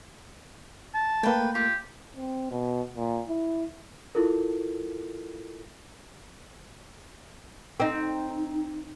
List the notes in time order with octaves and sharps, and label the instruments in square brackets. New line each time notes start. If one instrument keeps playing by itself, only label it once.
[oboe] A5
[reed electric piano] A3 A#3 [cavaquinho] B4 G5
[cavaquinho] F4 [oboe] G4
[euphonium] C4
B2
A#2
E4
[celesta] E4 F4 A4 A#4
[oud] C4 D#4